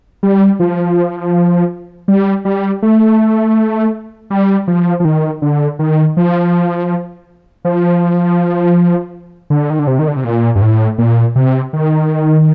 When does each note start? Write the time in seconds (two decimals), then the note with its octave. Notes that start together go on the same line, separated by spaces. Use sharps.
0.23 G3
0.60 F3
2.08 G3
2.45 G3
2.82 A3
4.30 G3
4.68 F3
5.00 F3
5.05 D#3
5.42 D3
5.79 D#3
6.17 F3
7.65 F3
9.50 D3
9.70 D#3
9.79 D3
9.87 C3
9.99 D#3
10.08 D3
10.16 C3
10.24 A#2
10.56 G2
10.62 A2
10.98 A#2
11.36 C3
11.73 D#3